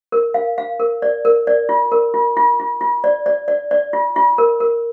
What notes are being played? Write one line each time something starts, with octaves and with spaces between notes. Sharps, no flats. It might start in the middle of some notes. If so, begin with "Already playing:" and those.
A#4
F5
F5
A#4
D5
A#4
D5
F4
A#4
F4
F4
F4
F4
D5
D5
D5
D5
F4
F4
A#4
A#4